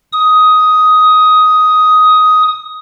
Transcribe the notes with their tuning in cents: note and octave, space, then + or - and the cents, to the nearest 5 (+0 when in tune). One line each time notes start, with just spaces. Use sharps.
D#6 +10